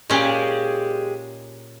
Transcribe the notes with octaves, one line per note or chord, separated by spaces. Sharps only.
A#2 G#3 C#4 G4